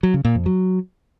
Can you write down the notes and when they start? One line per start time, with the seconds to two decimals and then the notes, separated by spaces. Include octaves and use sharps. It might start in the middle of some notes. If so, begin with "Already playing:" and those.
0.03 F#3
0.14 C#3
0.25 A#2
0.35 F2
0.46 F#3